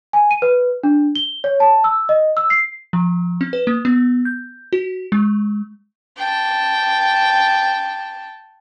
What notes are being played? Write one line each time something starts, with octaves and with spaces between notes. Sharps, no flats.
G#5
D#7
B4
D4
G7
C#5
A5
E6
D#5
E6
C7
F3
C4
B4
A#3
B3
G6
F#4
G#3
G5 A5